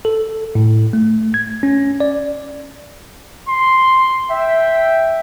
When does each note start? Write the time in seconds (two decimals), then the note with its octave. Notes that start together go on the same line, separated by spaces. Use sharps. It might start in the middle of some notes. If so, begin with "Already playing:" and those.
0.05 A4
0.55 A2
0.93 A3
1.34 G#6
1.63 C#4
2.00 D5
3.48 C6
4.30 E5 G5